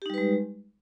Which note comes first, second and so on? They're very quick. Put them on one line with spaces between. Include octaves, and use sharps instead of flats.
G4 D#4 G3 B4 G#3